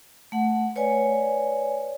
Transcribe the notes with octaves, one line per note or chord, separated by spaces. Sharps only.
A3 F#5
B4 C#5 D5 G#5